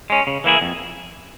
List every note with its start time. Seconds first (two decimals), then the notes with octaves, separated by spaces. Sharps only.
0.10 G#3 C#4
0.27 C#3
0.44 E3 A#3 E4 G#4
0.61 F2